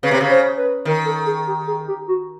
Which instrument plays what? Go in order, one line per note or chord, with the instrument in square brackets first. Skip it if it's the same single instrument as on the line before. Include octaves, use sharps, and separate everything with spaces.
[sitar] C#3 [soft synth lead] B4
[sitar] C3
C#3
[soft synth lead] C5
B4
[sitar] D#3 [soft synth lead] A#4
[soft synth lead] A4
G#4
G4
G#4
G4
F#4